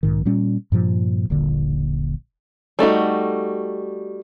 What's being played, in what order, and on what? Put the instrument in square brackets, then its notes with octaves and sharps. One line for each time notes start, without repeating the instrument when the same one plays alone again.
[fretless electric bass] B1 G#2 D#3
A#2 G3 C#4
G2 A#2 F3
D#1 A#1 A#2 D3
[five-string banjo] G3 A3 D#4 F#4